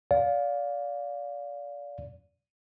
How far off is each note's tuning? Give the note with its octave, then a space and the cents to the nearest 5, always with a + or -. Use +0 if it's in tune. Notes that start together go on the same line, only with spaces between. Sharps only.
D5 -30 F5 +15